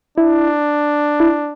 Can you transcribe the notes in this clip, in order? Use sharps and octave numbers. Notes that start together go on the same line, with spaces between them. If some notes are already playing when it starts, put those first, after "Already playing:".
D4 E4
E4